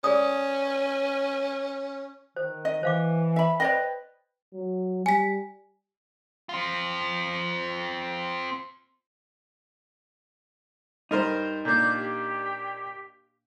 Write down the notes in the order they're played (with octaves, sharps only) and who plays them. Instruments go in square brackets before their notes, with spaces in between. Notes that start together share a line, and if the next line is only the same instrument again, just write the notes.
[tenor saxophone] C#4 [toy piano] G#4 D5 D#6
[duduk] D#3 [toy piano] C5
[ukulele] D#5
[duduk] E3 [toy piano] C5 F5 D6
[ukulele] E5 B5
[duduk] B4 [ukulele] C5 D5 D#5 [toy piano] G5
[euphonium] F#3
[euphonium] G3 [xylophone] G#5 B6
[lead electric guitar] C4 F4
[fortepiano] G2 A#4 C5 [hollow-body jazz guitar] D#4
[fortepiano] A#2 A#3 D4 [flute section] D6 G6
[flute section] G4